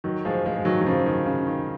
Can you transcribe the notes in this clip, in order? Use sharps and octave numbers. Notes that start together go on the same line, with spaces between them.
D#3 F#3
F3 G#3
F3 G#3
G#3
D#3 F#3
F#3
C#3 F3
D#3
C#3
D#3